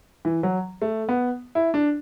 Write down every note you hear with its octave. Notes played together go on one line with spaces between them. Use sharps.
E3
F#3
A3
B3
E4
D4